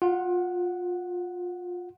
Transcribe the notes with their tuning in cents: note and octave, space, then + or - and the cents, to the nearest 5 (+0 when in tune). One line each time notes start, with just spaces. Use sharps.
F4 +25 F#5 +0